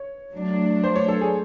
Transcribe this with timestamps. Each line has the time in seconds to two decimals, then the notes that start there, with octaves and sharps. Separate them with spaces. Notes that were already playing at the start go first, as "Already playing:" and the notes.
Already playing: C#5
0.32 F#3 A3 D4
0.84 C5
0.96 C#5
1.08 A4
1.21 G#4